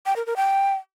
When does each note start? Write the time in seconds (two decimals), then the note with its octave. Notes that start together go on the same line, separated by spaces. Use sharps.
0.06 G5
0.16 A#4
0.26 A#4
0.36 G5